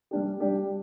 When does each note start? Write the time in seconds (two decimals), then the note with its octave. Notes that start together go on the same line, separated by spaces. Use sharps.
0.11 G3 D4 G4
0.40 G3 D4 G4